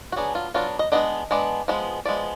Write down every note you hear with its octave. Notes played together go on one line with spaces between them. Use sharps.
F#4
F#3 B3 D4 G#4
F4
F#3 B3 D4 F4
D#5
G#3 B3 D4 D#5
G#3 B3 D4
F3 G#3 B3
F3 G#3 B3 D5